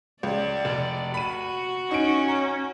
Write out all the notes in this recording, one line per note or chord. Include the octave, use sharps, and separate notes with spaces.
C#2 D5
F1
F#4 B5 D#7
C#4 D#4 D7
A#5